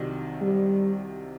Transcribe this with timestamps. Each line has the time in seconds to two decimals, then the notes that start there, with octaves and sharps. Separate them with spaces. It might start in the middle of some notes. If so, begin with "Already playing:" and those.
Already playing: C2 C3 D#3 F#3
0.42 G3